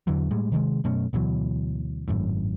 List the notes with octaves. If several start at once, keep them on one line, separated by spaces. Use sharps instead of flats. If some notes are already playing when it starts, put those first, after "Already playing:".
E2 D3 E3 F#3
A2 G3 G#3
C3 D#3 F3 G#3
F#2 B2 A3 C#4
D2 B2 E3 F#3
G#1 F#2 A2